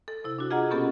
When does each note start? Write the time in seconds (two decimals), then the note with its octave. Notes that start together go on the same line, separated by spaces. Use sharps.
0.08 A4
0.24 C3 E4
0.38 D4 F#4
0.51 F4 G#4 D#5 F#5 A#5
0.70 B2 A#3 B3 C#4 G4 A4